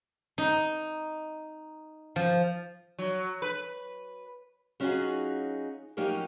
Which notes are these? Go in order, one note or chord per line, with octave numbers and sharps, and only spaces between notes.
D#4
F3
F#3
B4
F#3 C#4 D#4 F4 F#4 G#4
F3 F#3 A#3 C#4 D#4 G4